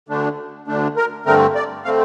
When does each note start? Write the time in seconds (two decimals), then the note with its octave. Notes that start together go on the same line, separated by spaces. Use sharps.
0.08 D2 D3 A3 D4
0.67 D2 D3 A3 D4
0.97 A#4
1.26 G2 D3 A3 C4 A#4
1.55 D5
1.85 D3 A3 C4 F5